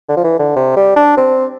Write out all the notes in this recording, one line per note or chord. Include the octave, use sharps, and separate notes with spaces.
D3
F3
E3
D3
C3
G3
D4
C4